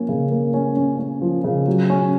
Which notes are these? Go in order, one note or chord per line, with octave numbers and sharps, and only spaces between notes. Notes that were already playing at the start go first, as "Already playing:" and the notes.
Already playing: F3 A#3 C#4
C#3
A#3
C#4
C#4
C#4
F3
C#3
F#3
C#4